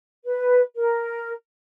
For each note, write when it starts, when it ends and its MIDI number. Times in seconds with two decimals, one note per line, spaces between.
0.25 0.60 71
0.76 1.31 70